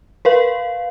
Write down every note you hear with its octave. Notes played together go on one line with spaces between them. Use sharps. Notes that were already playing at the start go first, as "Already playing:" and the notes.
A#4 B4 F5